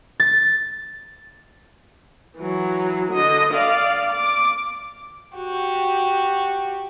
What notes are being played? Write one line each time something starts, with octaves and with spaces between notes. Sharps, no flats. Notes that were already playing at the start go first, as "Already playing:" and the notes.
A6
E3 F#3
D3 D#5
D5 F5
D6
F#4 G4